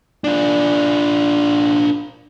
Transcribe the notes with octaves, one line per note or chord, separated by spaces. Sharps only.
D4 F4